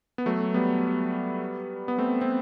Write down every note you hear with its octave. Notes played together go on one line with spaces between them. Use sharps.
B3
F#3 A3
G3 B3
B3
A3 C4
C4